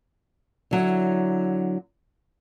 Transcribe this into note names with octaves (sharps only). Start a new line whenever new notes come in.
D3 F#3 E4